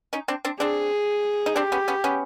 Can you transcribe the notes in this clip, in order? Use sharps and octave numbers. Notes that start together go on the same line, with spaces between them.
C#4 D#4
C4 D4
C4 D4
C4 D4 G#4
D#4
C4 D4 G4
B3 C#4
B3 C#4
B3 C#4